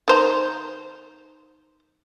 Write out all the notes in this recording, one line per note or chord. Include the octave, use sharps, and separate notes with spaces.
D#3 C5 A#5